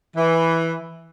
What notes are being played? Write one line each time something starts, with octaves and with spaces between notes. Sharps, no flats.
E3